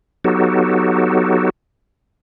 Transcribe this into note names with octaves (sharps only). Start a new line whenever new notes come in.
F#3 B3 D#4 F#4 G4 A4